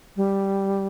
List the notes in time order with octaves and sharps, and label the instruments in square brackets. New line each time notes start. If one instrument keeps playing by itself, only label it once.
[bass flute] G3